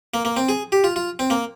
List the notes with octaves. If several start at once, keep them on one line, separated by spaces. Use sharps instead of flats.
A#3
A#3
C4
G#4
G4
F4
F4
C4
A#3